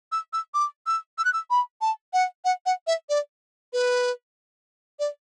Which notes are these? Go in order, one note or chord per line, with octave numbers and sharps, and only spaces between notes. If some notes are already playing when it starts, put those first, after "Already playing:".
E6
E6
D6
E6
E6
F#6
E6
B5
A5
F#5
F#5
F#5
E5
D5
B4
D5